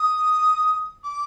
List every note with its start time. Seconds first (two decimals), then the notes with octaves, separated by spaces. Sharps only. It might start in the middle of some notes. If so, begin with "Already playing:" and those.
Already playing: D#6
1.03 D6